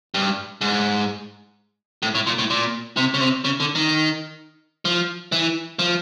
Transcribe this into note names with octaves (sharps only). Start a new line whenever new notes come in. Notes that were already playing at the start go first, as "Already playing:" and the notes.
G2
G#2
A2
A2
A#2
A2
A#2
C3
C#3
C3
C#3
D3
D#3
F3
E3
F3